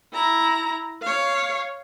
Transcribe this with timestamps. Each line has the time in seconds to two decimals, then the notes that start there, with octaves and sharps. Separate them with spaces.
0.13 E4 A#5
1.03 C#5 F5